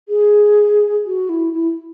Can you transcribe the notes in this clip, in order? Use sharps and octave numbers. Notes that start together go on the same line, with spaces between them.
G#4
F#4
E4
E4